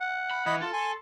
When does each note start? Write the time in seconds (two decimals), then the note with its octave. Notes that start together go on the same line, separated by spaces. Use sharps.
0.01 F#5
0.31 B5
0.46 E3 D#5 B5
0.62 F4 A4
0.73 G#5 C6